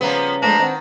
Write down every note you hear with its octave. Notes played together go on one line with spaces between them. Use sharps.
C#3 F3 G3 A#3 B3 C#4
B2 F3 G#3 A3 D4 D5 A#5
D#3 C4 B4 F#5